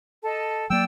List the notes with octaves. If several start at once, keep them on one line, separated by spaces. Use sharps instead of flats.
A4 D#5 A5
F#3 A#3 D5 G5 E6